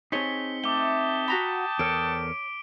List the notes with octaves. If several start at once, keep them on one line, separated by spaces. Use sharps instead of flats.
C4 D#4 G#4 C#5 A5 B6 C#7 G7
A3 G5 A5 D6 D#6 G7
F#4 A#5 B5
E2 A4 A#4 C#5 D7